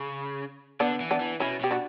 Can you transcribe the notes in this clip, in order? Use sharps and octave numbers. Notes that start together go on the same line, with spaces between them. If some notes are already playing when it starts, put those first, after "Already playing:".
Already playing: C#3
D3 B3 D4
E3
B3 D4
E3
B2 C#4 E4
B2 G4
D4 F#4